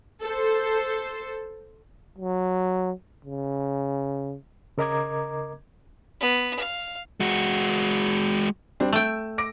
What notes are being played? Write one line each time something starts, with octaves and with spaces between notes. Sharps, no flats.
A4 C5
F#3
C#3
C#3 A#4 D#5 A#5 D6 G#6
B3
F5
G#3 F#4
G3 C4 D4
A3 G5 E6
D6 A#6 D7